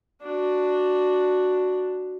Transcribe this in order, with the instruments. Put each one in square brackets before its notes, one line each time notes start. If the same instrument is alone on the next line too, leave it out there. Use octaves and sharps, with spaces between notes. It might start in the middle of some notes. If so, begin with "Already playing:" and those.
[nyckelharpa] D4 F#4